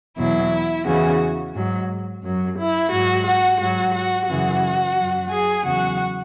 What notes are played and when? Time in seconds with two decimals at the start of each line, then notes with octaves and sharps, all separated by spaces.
0.17 E2 B2 F#3 E4
0.85 E2 C#3 E3 F#4
1.54 G#2 F#3
2.23 F#2 F#3
2.57 E4
2.92 G#2 F#3 F#4
3.25 F#4 F#5
3.59 G#2 F#3 F#4 F#5
3.94 F#4 F#5
4.28 F#2 C#3 E3 F#4 F#5
4.97 F#2 F#3
5.30 G#4 G#5
5.65 E2 C#3 F#3 F#4 F#5